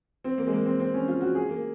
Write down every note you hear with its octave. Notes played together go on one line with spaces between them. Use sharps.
C4
A#3
G#3
A#3
C4
C4
C#4
F4
F#4
G#4
A#3